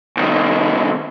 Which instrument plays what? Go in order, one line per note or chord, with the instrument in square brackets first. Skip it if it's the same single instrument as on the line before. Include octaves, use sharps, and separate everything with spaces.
[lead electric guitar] C2 D#3